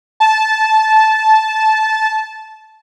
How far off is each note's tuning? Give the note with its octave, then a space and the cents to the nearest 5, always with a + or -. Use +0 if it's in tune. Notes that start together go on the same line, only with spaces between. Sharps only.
A5 -15